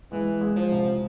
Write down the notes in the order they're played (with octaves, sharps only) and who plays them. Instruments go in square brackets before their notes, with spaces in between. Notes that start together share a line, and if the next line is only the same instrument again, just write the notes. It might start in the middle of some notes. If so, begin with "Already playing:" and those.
[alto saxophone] E3 [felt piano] G#3
[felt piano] G#3
[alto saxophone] F3
[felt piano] C2